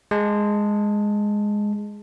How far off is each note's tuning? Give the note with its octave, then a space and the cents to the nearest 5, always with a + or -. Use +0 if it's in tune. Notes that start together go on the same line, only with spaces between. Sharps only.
G#3 +0 A5 +0